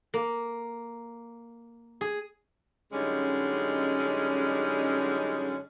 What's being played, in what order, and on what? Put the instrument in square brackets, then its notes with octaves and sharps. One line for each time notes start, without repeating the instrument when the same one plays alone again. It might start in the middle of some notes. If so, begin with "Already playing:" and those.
[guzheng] A#3
G#4
[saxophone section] F#2 D3 G3 G#3 C#4 D#4